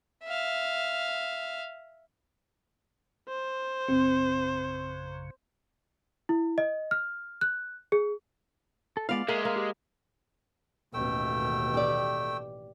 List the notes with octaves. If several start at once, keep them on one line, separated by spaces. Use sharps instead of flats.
E5 F5
C5
A#1 F#2 C#3 C4
E4
D#5
F6
F#6
G#4
A4
G#3 B3 F4 D5 F5
G#3 A#3 E5 F5
A#3
G4
A1 D#2 B2 A3 G5 E6
G4 D5